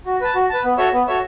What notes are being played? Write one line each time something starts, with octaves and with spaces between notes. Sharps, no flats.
F#4
B4 A5
F#4
B4 A5
B3
F#4 A4 C#5 E5
B3
F#4 A4 C#5 E5